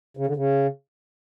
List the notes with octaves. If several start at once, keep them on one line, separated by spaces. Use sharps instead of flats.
C#3
D3
C#3